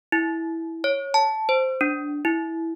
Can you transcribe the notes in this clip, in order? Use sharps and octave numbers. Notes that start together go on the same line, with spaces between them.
E4
C#5
A5
C5
D4
E4